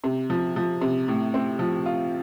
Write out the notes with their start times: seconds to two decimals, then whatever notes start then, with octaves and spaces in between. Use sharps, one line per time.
0.04 C3
0.30 F3
0.56 F3
0.81 C3
1.08 A2
1.34 C4
1.59 F3
1.86 F4